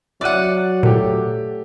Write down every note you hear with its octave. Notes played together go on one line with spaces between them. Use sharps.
F#3 D5 E5 F#5 F#6 D#7
A#2 A3 G4